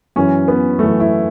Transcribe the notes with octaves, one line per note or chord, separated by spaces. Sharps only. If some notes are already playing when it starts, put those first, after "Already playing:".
F#2 E3 C#4
B3
F#2 E3 A3
E4